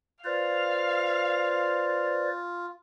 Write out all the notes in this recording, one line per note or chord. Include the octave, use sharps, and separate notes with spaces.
F4 B4 C5 D5 F5